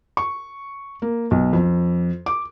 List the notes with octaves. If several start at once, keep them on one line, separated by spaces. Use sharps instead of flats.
C#6
A#3
B1
F2
D6